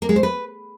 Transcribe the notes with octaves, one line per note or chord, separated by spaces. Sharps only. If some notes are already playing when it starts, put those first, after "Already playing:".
A#3
G#3
C5
B4